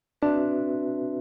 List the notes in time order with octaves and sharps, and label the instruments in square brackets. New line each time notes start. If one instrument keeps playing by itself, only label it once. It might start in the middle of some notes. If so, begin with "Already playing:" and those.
[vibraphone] C4 F#4 B4 E5 [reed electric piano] D4